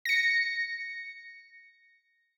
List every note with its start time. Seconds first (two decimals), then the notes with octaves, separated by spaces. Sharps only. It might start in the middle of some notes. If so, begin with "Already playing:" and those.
0.05 A#6 C#7